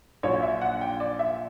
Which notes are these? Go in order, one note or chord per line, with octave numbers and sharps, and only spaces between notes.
A#1 A#2 F#3 C#5
E5
F#5
G5
D5
E5